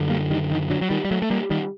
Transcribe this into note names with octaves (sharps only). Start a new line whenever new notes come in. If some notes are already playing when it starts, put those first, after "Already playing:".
Already playing: F#2 D3
G3 A#3
D#3 G3
D#3
D3 F#3
F#3
D#3 G3
G3
F#3 A3
A3
G3 A#3
D#3 G3